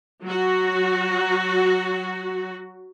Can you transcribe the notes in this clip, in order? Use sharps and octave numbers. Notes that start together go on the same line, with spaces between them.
F#3 F#4